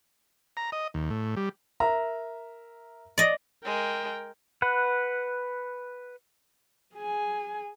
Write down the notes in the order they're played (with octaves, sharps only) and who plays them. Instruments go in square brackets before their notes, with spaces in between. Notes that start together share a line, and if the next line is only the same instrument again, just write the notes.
[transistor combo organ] A#5
D#5
D#2
A2
G3
[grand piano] A#4 E5 A#5
[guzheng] D5 D#5
[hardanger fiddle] G#3 [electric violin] A#4 G5
[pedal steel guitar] B4 F#5
[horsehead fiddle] G#4 G#5